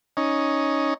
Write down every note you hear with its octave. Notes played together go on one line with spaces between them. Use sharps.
C#4 D#4